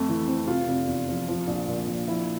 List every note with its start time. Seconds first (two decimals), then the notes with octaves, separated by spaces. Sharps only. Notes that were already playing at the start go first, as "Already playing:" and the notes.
Already playing: F2 A3
0.09 E3
0.28 C4
0.48 C3 F4
0.68 F1
0.87 E2
1.08 F3
1.28 F3
1.47 A#1
1.68 A#2
1.88 A#1
2.08 F3 E4